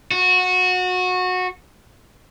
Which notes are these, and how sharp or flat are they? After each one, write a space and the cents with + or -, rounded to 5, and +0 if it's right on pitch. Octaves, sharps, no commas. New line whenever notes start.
F#4 -20